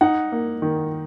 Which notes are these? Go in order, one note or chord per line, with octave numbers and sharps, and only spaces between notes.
D#4 F#5
A#3
D#3